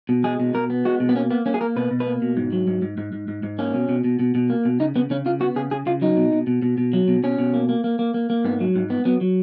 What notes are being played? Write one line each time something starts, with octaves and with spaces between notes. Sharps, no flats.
B2
G#3 G#4
B2
B2 A#4
B3
G#3 F#4
B2
B3
A#3 C#4
A#3 B3
A#3 C#4
G#4
A#3 A#4
B2 B4
B2
B4
A#3
B2
G#2
F#3
G#2
G#2
G#2
G#2
G#2
G#2
A#3 C#4
B2
B2
B2
B2
B2
A#3
B2
C#3 D#4
C#3 B3
C#3 C#4
C#3 F4
B3 F#4
C#3 G#4
C#3 G#4
C#3 F4
F#3 D#4
B2
B2
B2
B2
B2
F#3
B2
B2 C#4
B2
A#3
A#3
A#3
A#3
A#3
A#3
G#2 B3
F#3
G#2
B3
F#3 B3
F#3